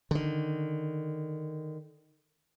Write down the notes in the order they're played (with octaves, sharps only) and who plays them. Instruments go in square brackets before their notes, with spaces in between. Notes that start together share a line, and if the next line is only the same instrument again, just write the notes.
[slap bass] D3 D#3